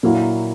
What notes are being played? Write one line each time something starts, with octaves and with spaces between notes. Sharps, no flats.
A#2 F#3 A#3 E4